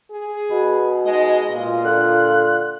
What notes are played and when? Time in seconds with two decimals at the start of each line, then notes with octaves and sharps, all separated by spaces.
0.11 G#4
0.51 B2 B4
1.05 G#3 D#4 D#5
1.51 A#2 F4
1.85 D3 F#6